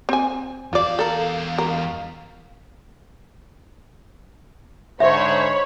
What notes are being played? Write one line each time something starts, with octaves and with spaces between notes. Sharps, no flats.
C4 G#5
E2 F4 D5 F5
A4 A#4
A#4
G#2 D3 C5 C#5 E5 B5